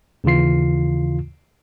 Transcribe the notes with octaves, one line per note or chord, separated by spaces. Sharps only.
D#2 C#3 E3 F4 C7